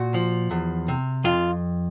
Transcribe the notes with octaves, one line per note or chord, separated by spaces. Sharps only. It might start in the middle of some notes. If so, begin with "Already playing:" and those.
Already playing: A#2 F#4
F3
E2
C3
F2 F4